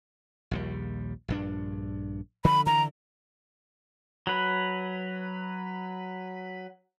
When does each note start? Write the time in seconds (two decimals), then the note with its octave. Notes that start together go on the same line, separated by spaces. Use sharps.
0.51 A#1 D#2 G3
1.28 A#1 G2 D4
2.45 D3 F3 B5
2.66 D3 E3 A#5
4.27 F#3 B4